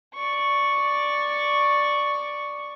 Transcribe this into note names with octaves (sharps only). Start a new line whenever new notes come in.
D5 C#6